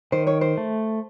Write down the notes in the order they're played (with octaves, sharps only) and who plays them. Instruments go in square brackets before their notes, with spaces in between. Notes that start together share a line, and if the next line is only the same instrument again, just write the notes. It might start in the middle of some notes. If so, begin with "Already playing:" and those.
[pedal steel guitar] D#3 [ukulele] C5
[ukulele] C#5
C5
[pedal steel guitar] A3